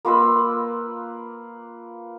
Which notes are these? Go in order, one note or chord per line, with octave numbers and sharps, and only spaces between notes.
A#3 F4 B4 E6